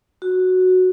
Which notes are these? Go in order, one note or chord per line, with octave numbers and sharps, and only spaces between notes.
F#4